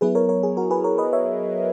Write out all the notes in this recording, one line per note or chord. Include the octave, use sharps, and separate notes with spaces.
F#3 B3 E4 G#4 B4
A#4 C#5
A#4 C#5
G#4
F#4 A#4
G#4 B4
A#4 C#5
B4 D#5
C#5 E5